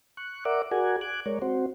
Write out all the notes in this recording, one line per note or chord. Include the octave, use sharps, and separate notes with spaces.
C#6 F#6
A#4 D5 E5 F#5 D6
F#4 G#4 A#4 D5 F#5 G#5
G#5 D6 F#6
G#3 A#4 C#5 D5
C4 F#4 C5